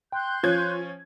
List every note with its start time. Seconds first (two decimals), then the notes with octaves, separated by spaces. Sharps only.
0.12 G5 C6 F#6 G6
0.43 F3 C#4 F4 G#6